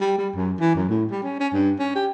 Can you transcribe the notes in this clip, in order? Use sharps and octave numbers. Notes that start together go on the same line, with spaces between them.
G3
G3
F#2
E3
F#2
A2
G3
C#4
C#4
G2
C#4
G4